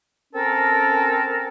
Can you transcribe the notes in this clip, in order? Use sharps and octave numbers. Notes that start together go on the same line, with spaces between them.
C4 C#4 A4 A#4